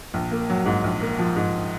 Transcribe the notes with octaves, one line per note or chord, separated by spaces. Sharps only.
A#1
A#3
F#3
G#2
A#1
A#3
F3
G#2